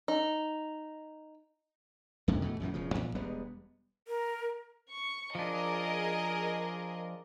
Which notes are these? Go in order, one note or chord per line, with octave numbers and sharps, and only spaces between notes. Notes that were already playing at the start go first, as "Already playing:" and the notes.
D#4
F2 C3 E3
B2 E3 A3
A1 F#2 A2 E3
E1 C#3 F3
E2 A#2
E1 G3 G#3 B3
A#4
C#6
F3 D4 G#4 A#4 D#5